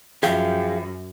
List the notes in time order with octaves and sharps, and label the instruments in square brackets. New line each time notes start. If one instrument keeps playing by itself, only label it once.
[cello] F#2 [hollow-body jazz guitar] F3 [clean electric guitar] G#4 F5 G5 [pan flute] E5